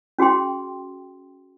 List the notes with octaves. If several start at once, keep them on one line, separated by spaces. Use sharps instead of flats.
C#4 F#4 G#4 G5 C6